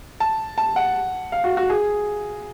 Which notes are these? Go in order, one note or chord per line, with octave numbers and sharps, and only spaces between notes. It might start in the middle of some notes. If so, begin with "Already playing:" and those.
A5
A5
F#5
F5
F#4
F#4
G#4